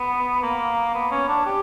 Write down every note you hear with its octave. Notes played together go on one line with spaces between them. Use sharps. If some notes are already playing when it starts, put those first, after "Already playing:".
Already playing: B3
A#3
B3
C#4
D4
G4